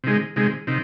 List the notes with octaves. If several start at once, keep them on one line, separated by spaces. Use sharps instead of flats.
C3 D#3 G#3
C3 D#3 G#3
C3 D#3